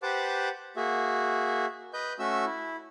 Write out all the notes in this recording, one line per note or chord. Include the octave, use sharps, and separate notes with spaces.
G4 B4 C5 F#5 A5 D6
A#3 F#4 G#4 E5
B4 D#5 G6
A3 C#4 F#4 E5 E6
E4